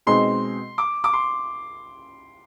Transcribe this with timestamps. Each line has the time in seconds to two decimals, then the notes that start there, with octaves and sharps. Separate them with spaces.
0.07 B2 G#3 C4 D#4 G#4 C6
0.78 D6
1.04 D6
1.13 C6